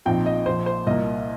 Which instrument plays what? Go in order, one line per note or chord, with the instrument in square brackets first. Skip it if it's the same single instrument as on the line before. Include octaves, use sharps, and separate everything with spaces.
[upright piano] A#1 A#2 F3 C4 D#4 G5
D#5
A#1 A#2 F3 C5
C5
C2 A#2 A#3 D#5